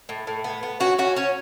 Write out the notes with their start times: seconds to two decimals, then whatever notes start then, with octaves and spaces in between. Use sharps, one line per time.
0.09 A2
0.27 A2
0.44 B3
0.63 B3
0.80 C#4 F#4
0.99 C#4 F#4
1.16 C#4 C#5